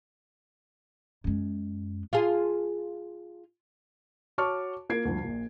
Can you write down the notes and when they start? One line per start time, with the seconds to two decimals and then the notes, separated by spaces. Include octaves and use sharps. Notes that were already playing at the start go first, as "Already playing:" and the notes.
1.24 F#2 G#3
2.13 F4 G#4
4.38 F#4 C#5 A5 C#6 D6 F6
4.90 A#3 F4 A#4 G#6 C7 D7
5.05 D2 G2 F3
5.22 A#1 A#2